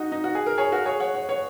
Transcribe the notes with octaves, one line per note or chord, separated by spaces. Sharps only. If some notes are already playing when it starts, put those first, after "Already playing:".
Already playing: D#4 F#4
D#4
F#4
G#4
A#4
G#4 C#5
F#4 A#4
G#4 C#5
C#5 F#5
C#5 F#5
C#5 F#5